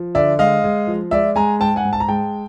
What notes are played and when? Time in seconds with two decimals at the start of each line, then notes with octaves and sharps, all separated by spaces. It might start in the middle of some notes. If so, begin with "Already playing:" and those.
Already playing: F3
0.15 D3 D5 E5
0.39 G#3 D#5 F5
0.64 G#3
0.87 F3
1.11 G#3 D5 E5
1.36 G#3 G#5 A#5
1.60 G#2 G5 A5
1.76 F#5 G#5
1.85 G#2
1.93 A5
2.00 A#5
2.08 G#3 G5 A5